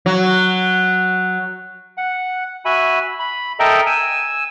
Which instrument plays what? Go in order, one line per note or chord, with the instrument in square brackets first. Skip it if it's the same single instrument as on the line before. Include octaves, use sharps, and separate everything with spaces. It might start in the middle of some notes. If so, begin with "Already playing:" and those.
[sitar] F#3
[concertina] F#5
F#4 E5 G#5 B5
B5
A4 A#4 D#5 E5 G5 A#5
G#5 E6